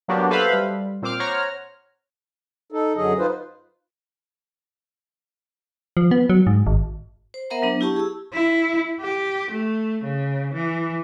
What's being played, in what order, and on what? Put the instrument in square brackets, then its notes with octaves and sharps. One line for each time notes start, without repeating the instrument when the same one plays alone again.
[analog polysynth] F#3 A#3 B3 D4 F#4 G4
A4 B4 C5 E5 F5 B5
G3
A#2 C4 C5 D6 F6
C5 C#5 F#5 A#5 F6
[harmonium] D#4 A4
F#2 D3 F#3 G#4 D#5
D#4 F4 B4 C5
[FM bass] F3
B3
F#3
G#2
G#1
[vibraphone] C5
B3 A#4 C5 E5 F#5 A#5
F#3 B3 D4
E4 G4 A5 C#6
G#4 E6
[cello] E4
G4
A3
C#3
E3